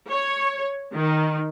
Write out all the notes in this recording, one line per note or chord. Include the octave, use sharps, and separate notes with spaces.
C#5
D#3